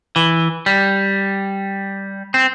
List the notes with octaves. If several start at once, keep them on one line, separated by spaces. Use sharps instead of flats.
E3
G3
C4